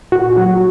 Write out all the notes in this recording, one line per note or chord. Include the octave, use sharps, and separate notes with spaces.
A#2 F#4
F#3 F#4